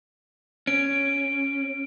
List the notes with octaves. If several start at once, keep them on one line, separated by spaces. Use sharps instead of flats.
C#4 D7